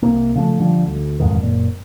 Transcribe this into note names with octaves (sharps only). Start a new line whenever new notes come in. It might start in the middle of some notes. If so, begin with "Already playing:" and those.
C2 C3 A#3
C#3 F3 A3
D3 F3 G3
D2
E1 F2 G#2 D#3
F#1 A#2